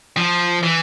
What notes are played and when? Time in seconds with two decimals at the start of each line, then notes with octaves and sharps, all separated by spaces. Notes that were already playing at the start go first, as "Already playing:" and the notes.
0.17 F3
0.63 E3